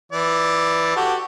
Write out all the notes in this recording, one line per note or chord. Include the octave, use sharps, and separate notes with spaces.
E3 D5
F#4 G4 A4